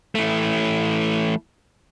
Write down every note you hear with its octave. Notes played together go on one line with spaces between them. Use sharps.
E3 A3